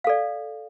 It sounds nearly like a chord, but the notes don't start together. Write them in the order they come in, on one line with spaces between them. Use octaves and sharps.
F5 A4 D5